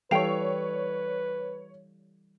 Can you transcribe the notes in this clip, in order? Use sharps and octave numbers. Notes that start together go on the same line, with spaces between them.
E3 G3 A4 B4 C#5 F5 G5 F7